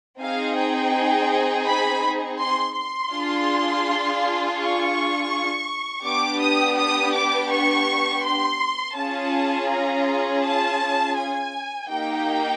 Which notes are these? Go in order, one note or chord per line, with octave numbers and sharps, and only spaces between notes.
C4 D#4 G#4 F5
G5
B5
C6
C6
D4 F4 G#4
C#6
B3 D4 G4 D6
D#6
D#6
D6
C#6
C6
C#4 F4 G#4 A5
A#5
A5
G#5
A#3 D#4 G4 G5